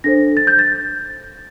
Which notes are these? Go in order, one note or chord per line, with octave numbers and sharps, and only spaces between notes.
D4 A4 C5 A#6
A6
G6
A6